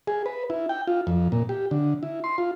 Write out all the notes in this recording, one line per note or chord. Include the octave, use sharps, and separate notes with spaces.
G#4
B4
E4
G5
F4
F2
A#2
G4
D3
E4
C6
F4